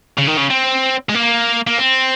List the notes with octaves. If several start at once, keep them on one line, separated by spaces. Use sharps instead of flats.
C#3
D#3
C#3
C4
G#3
A#3
A#3
C4